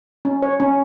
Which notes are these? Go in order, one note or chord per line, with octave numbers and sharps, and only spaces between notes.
C#4
C#5
C#4